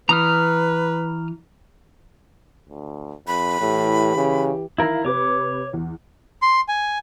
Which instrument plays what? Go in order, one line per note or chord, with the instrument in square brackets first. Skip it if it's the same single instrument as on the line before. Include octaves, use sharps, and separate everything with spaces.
[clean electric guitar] E3 [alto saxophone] B4 [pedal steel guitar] A#5 D#6 F6
[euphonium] D2
[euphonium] F2 [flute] B5
[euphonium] A2 [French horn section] E3 G4
[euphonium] C#3
[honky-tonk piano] D#3 E3 F5 [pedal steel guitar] E4 A#4
[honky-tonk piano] C3 B4 [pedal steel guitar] C#5 D6
[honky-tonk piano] E2
[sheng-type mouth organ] C6
G#5